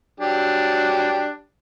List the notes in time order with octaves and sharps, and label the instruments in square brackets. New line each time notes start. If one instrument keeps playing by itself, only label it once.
[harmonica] F#3 D4 G4